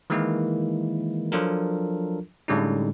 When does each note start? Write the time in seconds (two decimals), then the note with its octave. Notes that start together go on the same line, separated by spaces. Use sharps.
0.10 D#3 E3 G#3 A#3 E4
1.32 F3 F#3 D4 F4 A4 A#4
2.48 A2 D3 G3 G#3 C#4 D#4